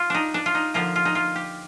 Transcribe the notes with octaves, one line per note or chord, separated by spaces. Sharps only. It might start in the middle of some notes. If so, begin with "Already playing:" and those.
Already playing: F4
D4 D#4
D4
F4
D#4
D3 F3 A#3 F4
F4
D#4
F4
G4